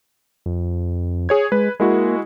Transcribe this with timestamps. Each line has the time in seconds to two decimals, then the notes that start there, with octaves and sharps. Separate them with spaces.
0.46 F2
1.29 G#4 C#5 G#6
1.52 G#3 B4
1.80 G#3 A#3 E4 F#4